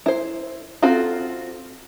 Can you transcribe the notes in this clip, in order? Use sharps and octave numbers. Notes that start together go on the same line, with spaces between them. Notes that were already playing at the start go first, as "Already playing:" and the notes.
E4 C5
C4 F4 F#4 A4